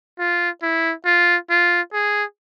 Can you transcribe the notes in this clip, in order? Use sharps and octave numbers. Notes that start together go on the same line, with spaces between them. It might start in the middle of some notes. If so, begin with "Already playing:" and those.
F4
E4
F4
F4
G#4